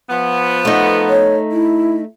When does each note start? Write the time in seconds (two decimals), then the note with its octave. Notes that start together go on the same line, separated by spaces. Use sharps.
0.09 F3 B3
0.65 A3 D#4
1.09 C#5
1.52 E4